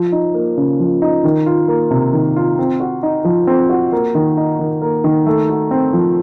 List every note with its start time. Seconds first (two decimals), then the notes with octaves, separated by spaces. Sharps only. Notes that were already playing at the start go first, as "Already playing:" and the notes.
Already playing: F3
0.12 D#4
0.34 A#3
0.57 C#3
0.80 F3
1.02 D#4
1.24 D#3
1.46 F4
1.68 A#3
1.91 C3
2.13 D#3
2.36 F4
2.59 C4
2.80 F#4
3.03 D#4
3.25 F3
3.47 C4
3.69 F#4
3.92 A#3
4.15 D#3
4.37 D#4
4.59 D#3
4.82 A#3
5.04 D#3
5.26 A3
5.49 F#4
5.71 C4
5.93 F3